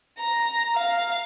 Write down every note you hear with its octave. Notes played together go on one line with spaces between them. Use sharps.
A#5
F5